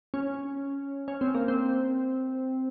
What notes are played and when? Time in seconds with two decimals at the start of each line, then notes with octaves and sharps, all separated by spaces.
0.14 C#4
1.08 C#4
1.21 C4
1.34 A#3
1.48 C4